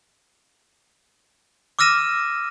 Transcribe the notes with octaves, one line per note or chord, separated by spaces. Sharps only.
D6 E6 F6 A#6 D#7 E7